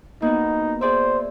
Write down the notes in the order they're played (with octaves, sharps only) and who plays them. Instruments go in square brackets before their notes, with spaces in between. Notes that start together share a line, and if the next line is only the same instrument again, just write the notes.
[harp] A#3 B3 F#4 [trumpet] D#4
[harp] G#4 D5 E5 [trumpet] C5